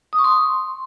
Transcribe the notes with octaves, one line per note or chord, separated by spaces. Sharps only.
D#6
C#6
C6